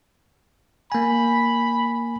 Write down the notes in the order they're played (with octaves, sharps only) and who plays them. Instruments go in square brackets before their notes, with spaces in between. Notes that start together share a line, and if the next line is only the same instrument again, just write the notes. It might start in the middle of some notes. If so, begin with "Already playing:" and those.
[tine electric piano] A#3 G#5 [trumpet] B5